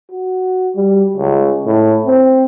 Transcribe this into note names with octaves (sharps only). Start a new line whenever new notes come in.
F#4
G3
C#2
A2
C4